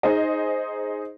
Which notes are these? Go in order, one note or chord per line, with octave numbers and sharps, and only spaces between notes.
D#4 G#4 C5 D#5